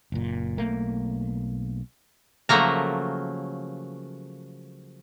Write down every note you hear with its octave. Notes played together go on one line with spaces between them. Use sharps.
F#1 A#2
B1 A3 A#3
C#3 F3 F#3 A3 A#3 A#5